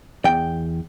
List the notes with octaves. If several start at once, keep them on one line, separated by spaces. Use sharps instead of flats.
E2 G5